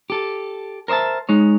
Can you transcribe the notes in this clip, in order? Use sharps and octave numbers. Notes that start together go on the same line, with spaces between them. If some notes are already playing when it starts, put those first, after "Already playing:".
G4 A4
A#4 C5 D5 E5 A5
G#3 D#4 C#5